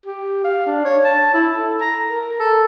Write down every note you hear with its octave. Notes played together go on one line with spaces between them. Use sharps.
G4
F5
D4
C#5
A5
E4
A4
A#5
A#4
A4